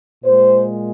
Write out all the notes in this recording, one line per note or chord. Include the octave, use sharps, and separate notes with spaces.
A#2 G#3 C5